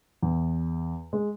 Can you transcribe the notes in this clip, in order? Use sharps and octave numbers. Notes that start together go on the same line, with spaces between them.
E2
G#3